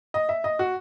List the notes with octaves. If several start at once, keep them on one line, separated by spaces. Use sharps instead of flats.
D#5
E5
D#5
F#4